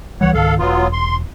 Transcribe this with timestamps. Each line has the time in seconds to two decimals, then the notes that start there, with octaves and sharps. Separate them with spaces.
0.21 C#2 E3 G3 C#5 F#5
0.34 C#2 G#2 D#3 A4 F5
0.59 E1 F#3 B3 F4
0.93 C6